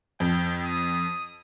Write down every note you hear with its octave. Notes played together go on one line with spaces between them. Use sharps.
F2 G5
D#6